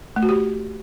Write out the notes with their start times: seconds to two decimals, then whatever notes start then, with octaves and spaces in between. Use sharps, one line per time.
0.16 A3
0.23 F#4
0.29 G4